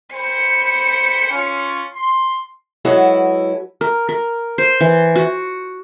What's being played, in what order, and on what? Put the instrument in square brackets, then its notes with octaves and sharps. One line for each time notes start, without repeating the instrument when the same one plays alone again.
[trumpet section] C5 G5 B5 [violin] C#7
[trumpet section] C#4 F4
C6
[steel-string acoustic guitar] F#3 G#3 E4 F#4 A4 B4
[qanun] A#4
A#4
C5
E3
F#4